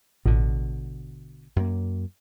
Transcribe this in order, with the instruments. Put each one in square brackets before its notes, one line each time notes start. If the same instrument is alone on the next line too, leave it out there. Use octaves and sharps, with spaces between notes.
[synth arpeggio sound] A1 [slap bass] B2 D3
[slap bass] F#2 A#3